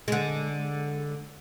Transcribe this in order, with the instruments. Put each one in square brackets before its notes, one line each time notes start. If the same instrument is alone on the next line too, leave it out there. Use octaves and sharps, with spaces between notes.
[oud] D3 G#3